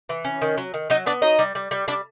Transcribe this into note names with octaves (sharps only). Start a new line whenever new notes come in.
E3
C#4
D#3
F#3
D#3
F#3 D#4 D#5
B3 D4 D5
F#3 D#4 D#5
G3
G3
G3
G3 D4 D5